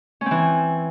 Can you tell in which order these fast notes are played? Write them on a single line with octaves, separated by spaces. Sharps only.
C#4 C4 E3